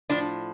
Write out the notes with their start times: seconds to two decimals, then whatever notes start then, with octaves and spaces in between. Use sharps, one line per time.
0.10 A2 F3 D4